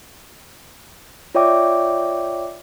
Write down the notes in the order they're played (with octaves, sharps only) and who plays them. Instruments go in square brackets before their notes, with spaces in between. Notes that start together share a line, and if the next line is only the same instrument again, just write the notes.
[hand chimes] F4 C#5 D5 E5 G5 D6